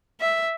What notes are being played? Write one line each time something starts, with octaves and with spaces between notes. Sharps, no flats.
E5